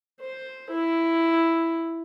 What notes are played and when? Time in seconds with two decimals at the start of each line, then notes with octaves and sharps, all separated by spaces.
0.21 C5
0.70 E4